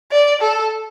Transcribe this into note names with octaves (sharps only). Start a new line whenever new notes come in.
D5
A4